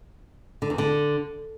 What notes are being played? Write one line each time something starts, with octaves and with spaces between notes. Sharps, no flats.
D3
E2
D3